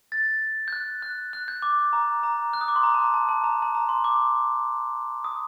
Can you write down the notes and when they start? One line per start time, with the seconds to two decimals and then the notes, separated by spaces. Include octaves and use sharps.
0.12 A6
0.68 G6
0.73 F#6
1.02 F#6
1.33 F#6
1.48 G6
1.62 D6
1.93 A#5
2.23 A#5
2.53 F#6
2.61 D#6
2.68 D6
2.76 C6
2.83 A#5
2.94 A5
3.04 A#5
3.14 A5
3.29 A5
3.44 A#5
3.62 A5
3.75 A#5
3.89 C6
4.04 D6
5.24 D#6